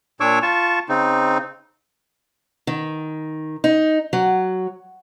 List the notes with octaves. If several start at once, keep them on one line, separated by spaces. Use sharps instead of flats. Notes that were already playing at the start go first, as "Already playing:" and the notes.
A#2 D4 C#5 C#6 D6 E6
F4 A5 C#6
C#3 C4 D#4
D#3
D#4
F#3